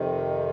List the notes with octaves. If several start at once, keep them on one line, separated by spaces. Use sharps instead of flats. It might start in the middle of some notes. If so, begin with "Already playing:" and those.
Already playing: F2 C3 D#3